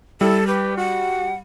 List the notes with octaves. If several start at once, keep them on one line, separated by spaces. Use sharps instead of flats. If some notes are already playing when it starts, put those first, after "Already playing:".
G3 E4 A4
G4 B4
F#4 F#5